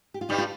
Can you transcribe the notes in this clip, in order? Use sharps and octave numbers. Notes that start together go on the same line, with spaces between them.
G4
F4
G2 G3 D#4
F4